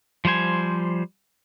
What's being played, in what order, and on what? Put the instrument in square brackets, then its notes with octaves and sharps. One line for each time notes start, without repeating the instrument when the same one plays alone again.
[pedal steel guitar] F3 G3 C5 G#5